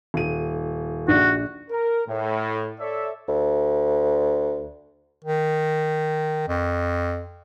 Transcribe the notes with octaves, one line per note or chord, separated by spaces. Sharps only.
D#1 D#7
A#1 F#4 D5
A#4
A2
A4 C#5 D5 E5
D2
D#3
F2